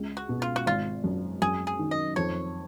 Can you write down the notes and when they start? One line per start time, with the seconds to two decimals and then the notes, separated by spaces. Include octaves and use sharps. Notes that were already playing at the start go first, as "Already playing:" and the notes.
Already playing: C#2
0.17 F#4
0.29 B2
0.42 F4
0.56 F#4
0.66 G#1 F4
1.04 F#2
1.42 F#2 G#4
1.67 G#4
1.79 D#3
1.91 D#5
2.16 F2 C#5